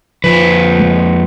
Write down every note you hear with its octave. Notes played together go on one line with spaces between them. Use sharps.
F2 C3 F3 B4
G#3